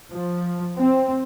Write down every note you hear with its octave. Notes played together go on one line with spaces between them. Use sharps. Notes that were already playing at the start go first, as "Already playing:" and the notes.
F3
C4